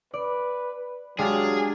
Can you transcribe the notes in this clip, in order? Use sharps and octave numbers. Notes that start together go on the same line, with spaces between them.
B4 D5
F#3 G#3 D4 G4 G#4 F5 A6